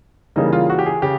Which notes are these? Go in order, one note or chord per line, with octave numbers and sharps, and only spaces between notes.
C#3 E3 G3 A#3 D#4
F4
F#4
G4
G#4
C#3 G4